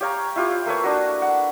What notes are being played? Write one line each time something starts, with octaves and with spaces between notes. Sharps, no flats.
G4 C#5 F5 A#5
E4 F4 G4
A#3 A4 B4 C#5
D4 F#4
F#5